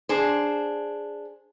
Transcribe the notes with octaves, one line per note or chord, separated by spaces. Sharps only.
D4 G#4 C5